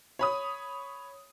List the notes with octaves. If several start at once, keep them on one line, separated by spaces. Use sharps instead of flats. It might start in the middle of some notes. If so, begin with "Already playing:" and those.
C#5 B5 D#6